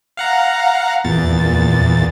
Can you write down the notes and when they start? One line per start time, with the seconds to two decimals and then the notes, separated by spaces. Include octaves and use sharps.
0.17 F5 F#5 A#5
1.04 E2 A#2 A6